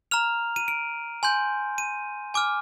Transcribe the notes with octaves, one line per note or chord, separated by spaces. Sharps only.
A#5 F6 F7
D#7
D7
G#5 C6 G6
D#7
G#5 D6 F6